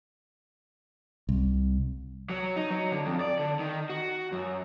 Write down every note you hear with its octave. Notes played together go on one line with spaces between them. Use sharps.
C2
F#3
D#4
F#3
D3
F2
D5
D3
D#3
F#4
F#2